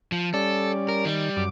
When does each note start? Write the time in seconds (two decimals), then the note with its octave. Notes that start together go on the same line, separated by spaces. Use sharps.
0.12 F3
0.34 G3 C#4 A4 D5
0.89 A#4
1.05 D#3 G3
1.37 F#2 D6